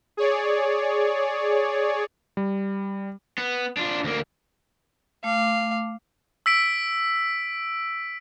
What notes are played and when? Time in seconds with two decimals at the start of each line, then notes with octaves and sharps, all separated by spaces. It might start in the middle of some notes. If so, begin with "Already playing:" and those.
0.17 G#4 C#5 D5
2.37 G3
3.38 B3
3.77 D4 F4
4.04 D2 A#3
5.24 A3 F5 D6
6.46 E6 B6 D7